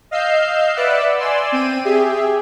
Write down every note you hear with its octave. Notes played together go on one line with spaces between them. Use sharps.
D#5 F5 E6 G6 C7
B4 D5 E5 F#5 E6 F#6
D5 G#5 C6 E6
C4 G5 D#7
G4 G#4 E5